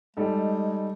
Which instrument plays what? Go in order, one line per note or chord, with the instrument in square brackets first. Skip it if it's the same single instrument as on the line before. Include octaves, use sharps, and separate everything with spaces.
[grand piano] G3 D#4 A4 [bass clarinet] G#3